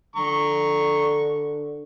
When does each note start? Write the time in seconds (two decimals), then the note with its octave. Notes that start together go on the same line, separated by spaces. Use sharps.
0.16 D3 A#5 C#6